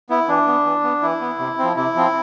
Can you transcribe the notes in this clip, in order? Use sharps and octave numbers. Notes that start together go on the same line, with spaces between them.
B3 E4
E3 D4
B3
E3
B3
E3 E4
B3
C3
F3 C4
C3 E4
F3 C4